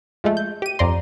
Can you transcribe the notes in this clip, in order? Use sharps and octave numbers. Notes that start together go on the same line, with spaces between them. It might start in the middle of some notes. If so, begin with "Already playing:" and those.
F3 G#3 A3
G6
G4 D#7
F2 D5 A#5 C6